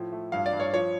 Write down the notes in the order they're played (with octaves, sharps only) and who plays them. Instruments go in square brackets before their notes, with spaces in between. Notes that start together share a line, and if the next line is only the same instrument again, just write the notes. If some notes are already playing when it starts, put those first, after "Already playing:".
Already playing: [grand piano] A2 F3
A3
G2 F5
D5
G2
C#5
F3 C#5